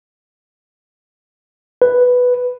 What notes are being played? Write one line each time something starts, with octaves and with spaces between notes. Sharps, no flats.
B4